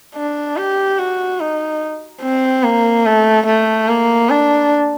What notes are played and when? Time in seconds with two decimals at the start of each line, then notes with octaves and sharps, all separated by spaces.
0.16 D4
0.57 G4
0.99 F#4
1.40 D#4
2.23 C4
2.64 A#3
3.05 A3
3.47 A3
3.89 A#3
4.30 D4